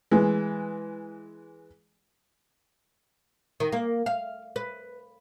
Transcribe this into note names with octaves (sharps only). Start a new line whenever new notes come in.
E3 G#3
D#3
A#3
F5
B4